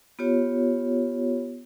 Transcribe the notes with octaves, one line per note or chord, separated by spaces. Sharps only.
B3 F4 G4 C#5